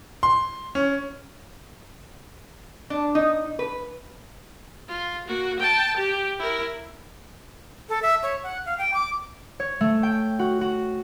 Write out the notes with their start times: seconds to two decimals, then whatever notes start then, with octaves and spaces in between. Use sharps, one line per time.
0.23 C6
0.75 C#4
2.90 D4
3.15 D#4
3.59 B4
4.89 F4
5.27 A#3 F#4
5.59 G5 A5
5.96 G4
6.39 E4 A#4
7.89 A4
8.02 E5
8.23 C#5
8.43 F#5
8.66 F5
8.78 G5
8.94 D6
9.60 C#5
9.81 A3
10.03 G5
10.39 F#4
10.61 F#4